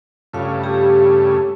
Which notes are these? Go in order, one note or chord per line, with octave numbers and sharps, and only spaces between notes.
G2 C#3 A3 F4 F5
G4